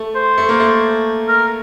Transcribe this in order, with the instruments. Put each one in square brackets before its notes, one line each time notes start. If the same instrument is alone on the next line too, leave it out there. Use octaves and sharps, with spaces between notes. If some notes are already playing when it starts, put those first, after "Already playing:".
Already playing: [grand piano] A3
[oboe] C5
[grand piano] A3
A#3
A3
[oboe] A#4